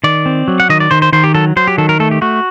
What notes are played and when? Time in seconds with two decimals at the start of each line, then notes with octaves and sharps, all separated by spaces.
0.04 D#3 D5
0.26 C4
0.48 F#3
0.60 F#5
0.69 D#3 D#5
0.80 D5
0.91 D#3 C5
1.02 C5
1.13 D#3 C5
1.24 G4
1.34 F#3 A4
1.56 F#3 C5
1.67 G4
1.78 D#3 A4
1.89 A#4
2.00 A3 A4
2.11 G4
2.21 A3 F#4